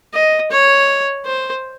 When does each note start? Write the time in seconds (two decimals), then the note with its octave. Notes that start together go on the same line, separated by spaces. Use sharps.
0.13 D#5
0.51 C#5
1.26 C5